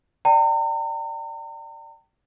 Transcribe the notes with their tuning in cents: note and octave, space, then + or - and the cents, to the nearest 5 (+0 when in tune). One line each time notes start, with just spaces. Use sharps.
D5 +0 G5 -20 A#5 -40